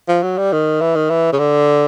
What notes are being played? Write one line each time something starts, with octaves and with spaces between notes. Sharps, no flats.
F3
F#3
G3
D#3
E3
D#3
E3
C#3
D3